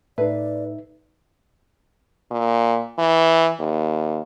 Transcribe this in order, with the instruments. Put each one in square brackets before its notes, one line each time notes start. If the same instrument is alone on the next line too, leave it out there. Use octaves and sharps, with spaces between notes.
[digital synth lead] A2 [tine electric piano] D#4 E5 [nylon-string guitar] B4 [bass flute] D5
[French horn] A#2
E3
D#2